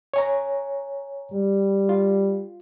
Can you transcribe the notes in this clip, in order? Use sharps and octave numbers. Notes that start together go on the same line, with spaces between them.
C#5 G#5 A#5
G3
F4